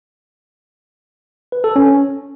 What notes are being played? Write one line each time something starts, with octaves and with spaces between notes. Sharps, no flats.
B4
A4
C#4